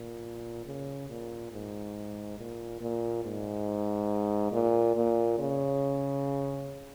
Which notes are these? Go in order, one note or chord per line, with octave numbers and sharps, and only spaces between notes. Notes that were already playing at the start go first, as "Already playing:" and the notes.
Already playing: A#2
C#3
A#2
G#2
A#2
A#2
G#2
A#2
A#2
C#3